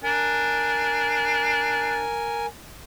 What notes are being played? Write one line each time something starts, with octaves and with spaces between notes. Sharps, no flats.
D4 A#4 G#5